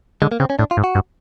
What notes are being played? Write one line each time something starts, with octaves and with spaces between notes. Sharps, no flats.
D3 G#3
A#3
C#3 C4
C#4
A2 D4
F4
G#2
F#4
G2